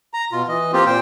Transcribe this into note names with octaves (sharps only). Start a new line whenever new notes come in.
A#5
B2 F4
E3 D#5
A#3 C4 F4 G4
A#2 C5 G5